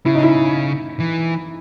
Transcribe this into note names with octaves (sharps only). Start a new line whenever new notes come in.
C#3 E4
D#4
E4
E3